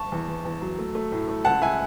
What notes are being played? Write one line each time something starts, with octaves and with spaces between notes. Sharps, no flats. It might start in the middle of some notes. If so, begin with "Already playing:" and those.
Already playing: A5 C#6
E2
E2
E2
F#3
A3
A3
A2
A3
C#2 F#5 A5
C#2 E5 G#5